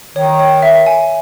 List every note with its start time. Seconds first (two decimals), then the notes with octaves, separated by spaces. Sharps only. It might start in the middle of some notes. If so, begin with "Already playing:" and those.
0.16 D#3 C#5
0.39 C#5
0.62 E5
0.86 G#5